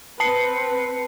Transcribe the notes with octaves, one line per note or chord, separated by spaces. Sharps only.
C4 B4 A5 C7 C#7